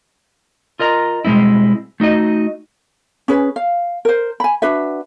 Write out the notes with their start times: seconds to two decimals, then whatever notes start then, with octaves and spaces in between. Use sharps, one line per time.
0.79 F4 A#4 D#5 A#5
1.25 B2 G3 G#3 C4 E4
2.00 A3 D#4 F#4 D#5
3.28 C#4 G#4 B4
3.56 F5
4.05 A#4 C5
4.40 G#5 B5
4.62 D4 F#4 B4 E5